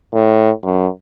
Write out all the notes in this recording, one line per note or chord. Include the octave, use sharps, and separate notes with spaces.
A2
F#2